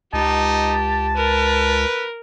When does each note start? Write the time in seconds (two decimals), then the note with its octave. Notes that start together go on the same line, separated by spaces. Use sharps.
0.14 C#2 D#4 G4 A5
1.16 A#4 B4